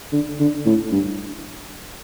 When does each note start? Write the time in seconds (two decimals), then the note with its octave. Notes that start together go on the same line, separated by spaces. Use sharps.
0.12 D3
0.39 D3
0.65 A2
0.92 G2